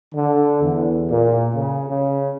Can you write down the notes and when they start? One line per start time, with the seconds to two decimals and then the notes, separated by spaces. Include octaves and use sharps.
0.13 D3
0.62 E2
1.10 A#2
1.53 C#3
1.88 C#3